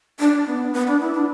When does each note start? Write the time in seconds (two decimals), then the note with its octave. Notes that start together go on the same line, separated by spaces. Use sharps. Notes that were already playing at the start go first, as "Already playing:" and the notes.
0.20 D4
0.47 B3
0.73 B3
0.87 D4
1.01 E4
1.14 D4